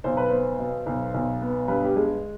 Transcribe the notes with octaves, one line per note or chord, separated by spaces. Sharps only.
B1 C5
B4
B3 C5
B2
B1
B1
B3
G2 B4
G4
G#3 G#4